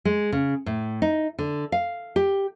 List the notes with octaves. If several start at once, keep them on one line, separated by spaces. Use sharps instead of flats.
G#3
C#3
A2
D#4
D3
F5
G4